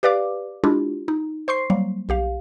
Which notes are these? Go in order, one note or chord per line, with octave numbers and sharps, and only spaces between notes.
G4 B4 D5 F5 D6
G#3 D4 E4 F4 G4
D#4
C5 C6 C#6 C7
F#3 G3 A#3
B1 G4 F5